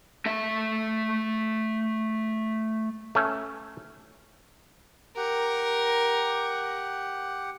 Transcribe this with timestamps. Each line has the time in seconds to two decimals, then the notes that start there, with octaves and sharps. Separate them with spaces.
0.26 A3 E5
3.15 A3 C#4
5.17 G4 A#4 F#5